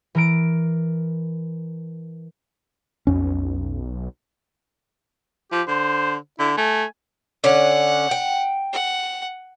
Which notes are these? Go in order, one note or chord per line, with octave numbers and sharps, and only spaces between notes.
E3 A#4 D7
B1 F2 C#4
F3 G4
D3 C5
D3 E4
A3 G#5
D3 C#4 F#5
G5
F#5